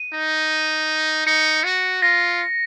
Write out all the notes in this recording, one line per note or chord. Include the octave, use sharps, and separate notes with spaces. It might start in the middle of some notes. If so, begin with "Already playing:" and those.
Already playing: D#7
D#4
D#4 C#7
F#4
F4 A#6